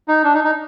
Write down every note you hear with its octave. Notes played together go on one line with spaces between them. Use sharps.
D#4
D4
D#4
D#4